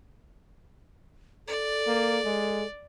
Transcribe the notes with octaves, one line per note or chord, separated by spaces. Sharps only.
A4 D5
A#3
G#3